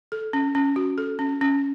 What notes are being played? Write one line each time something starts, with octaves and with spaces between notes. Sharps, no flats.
A4
C#4
C#4
F#4
A4
C#4
C#4